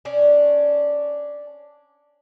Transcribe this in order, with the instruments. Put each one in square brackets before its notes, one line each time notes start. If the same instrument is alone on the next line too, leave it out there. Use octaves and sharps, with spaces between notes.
[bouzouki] C#4 D4